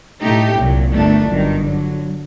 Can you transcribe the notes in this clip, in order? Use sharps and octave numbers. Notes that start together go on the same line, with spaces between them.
A2 A3 D#4 G4
C2 A#2 F#3
G1 G2 D#3 A3 D4
G1 F#2 D#3 G3
G2 D3 F#3